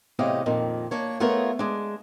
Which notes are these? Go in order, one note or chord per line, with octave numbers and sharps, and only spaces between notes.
E2 A2 C3 G4 D#5 F5
F2 A#2 D#3
A#3 D4 C#5
A3 B3 F4 G#4 A#4 C#5
G#3 D4